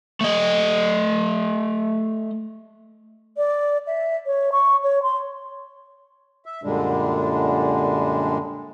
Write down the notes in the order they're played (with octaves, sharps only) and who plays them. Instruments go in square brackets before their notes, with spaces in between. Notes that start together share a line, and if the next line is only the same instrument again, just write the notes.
[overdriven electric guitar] A3 D#5
[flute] D5
E5
C#5
C#6
C#5
C6
[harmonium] E5
F#2 A#2 D3 G3 G#3 D4